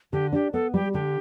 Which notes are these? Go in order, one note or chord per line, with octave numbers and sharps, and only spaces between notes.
D3 G4
D4 G4
B3 A4
G3 G4
D3 G4